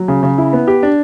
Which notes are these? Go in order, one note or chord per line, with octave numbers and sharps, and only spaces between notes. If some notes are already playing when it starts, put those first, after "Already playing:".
Already playing: F#3
C#3
C#3
E4
B3
G4
D4